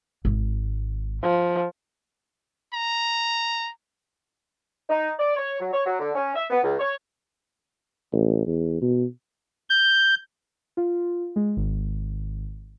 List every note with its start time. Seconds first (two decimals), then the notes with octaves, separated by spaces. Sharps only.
0.25 G#1
1.23 F3
2.73 A#5
4.90 D#4
5.19 D5
5.36 C#5
5.60 F#3
5.72 C#5
5.86 F#3
5.99 D3
6.15 C#4
6.35 E5
6.50 B3
6.62 C#2
6.79 C#5
8.13 A1
8.47 E2
8.82 B2
9.70 G6
10.77 F4
11.36 G#3
11.57 G#1